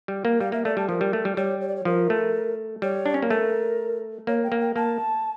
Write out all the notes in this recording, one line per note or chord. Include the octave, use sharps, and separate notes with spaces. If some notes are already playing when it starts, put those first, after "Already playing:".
G3
A#3
G3 F5
A#3 E5
A3 D5
G3 A5
F3 A#4
G3
A3
G3
G3 C#5
C#5
D5
C#5
F3 A#4
A3
G3 C#5
D4
C#4
A#3
A3 A#4
A#3 C#5
G5
A#3
G5
A#3 A5